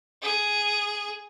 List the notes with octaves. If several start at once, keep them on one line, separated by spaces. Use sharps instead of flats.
G#4